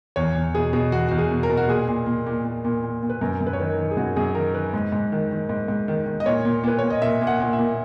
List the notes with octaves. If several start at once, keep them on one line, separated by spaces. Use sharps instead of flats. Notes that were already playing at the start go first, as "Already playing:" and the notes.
E2 C#5
E2
B2 G#4
B2 G#4
E2 F#4
E2 F#4
G#4
B2
A#4
B2
F#4
A#2 G#4
A#2
A#2
A#2
A#2
A#2
A#2
A#2
B4
F#2 A#4
F#2
B4
C#5
D#3 B4
A#4
D#3
G#4
F#2 F#4
F#2 G#4
D#3 A#4
D#3 B4
G#2
G#2
D#3
D#3
G#2
G#2
D#3
D#3
D#5
A#2 C#5
A#2
A#2 B4
A#2 C#5
D#5
A#2 E5
A#2
F#5
A#2
E5
A#2